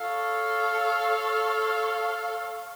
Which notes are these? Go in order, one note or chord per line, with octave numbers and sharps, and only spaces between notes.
A4 C#5 F5